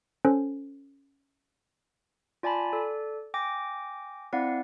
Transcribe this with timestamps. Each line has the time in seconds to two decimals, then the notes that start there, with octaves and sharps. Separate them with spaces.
0.25 C#4 A4 C5
2.43 F4 D5 G#5 A5 B5
2.73 A4 D5
3.34 G5 G#5 D6 A#6
4.33 C4 E4 D5 F5 F#5